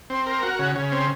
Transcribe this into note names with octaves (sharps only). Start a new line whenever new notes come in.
C4
A#4
F#4
C#3
C#3
C4